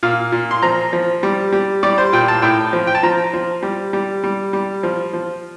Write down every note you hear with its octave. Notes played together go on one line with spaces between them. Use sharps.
A#2 F5
A#2
C6
F3 A#5
F3
G3
G3
G3 D5
C5
A#2 G5
A5
A2 G5
F3
G5
A5
F3 A#5
F3
G3
G3
G3
G3
F3
F3